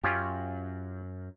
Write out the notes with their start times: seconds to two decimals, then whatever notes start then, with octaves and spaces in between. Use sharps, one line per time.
0.04 F#2 C#4 F4 G4